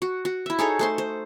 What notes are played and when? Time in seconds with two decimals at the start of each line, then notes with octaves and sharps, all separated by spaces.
0.02 F#4
0.25 F#4
0.46 E4 E5
0.59 D#4 G#4 A4 C#5
0.79 A3 C5 C6
0.98 C5